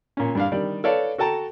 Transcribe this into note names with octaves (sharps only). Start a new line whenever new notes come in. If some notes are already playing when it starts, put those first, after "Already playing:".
A#2 C#4
G2 D4 F5
D#3 G3 D4 D5
A4 B4 C#5 D5 F5 A5
F#4 A4 G5 A5 A#5